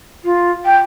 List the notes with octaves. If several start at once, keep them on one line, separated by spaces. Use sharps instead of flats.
F4
G5